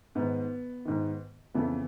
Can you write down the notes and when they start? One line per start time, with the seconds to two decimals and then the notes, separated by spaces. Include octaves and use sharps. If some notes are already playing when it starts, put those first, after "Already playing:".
0.15 G#2 D#3 B3
0.85 G#2 D#3
1.54 F2 C#3 E3 B3